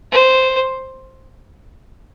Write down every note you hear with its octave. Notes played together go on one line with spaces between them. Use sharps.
C5